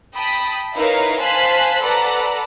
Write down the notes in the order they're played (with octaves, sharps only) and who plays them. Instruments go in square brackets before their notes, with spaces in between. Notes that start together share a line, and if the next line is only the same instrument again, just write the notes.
[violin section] G5 A5 B5 D#6 B6
D#4 E4 A#4 B4 C#5 F5
C5 F5 G#5 A5 F#6 B6
A4 B4 D5 F#5 A#5 B5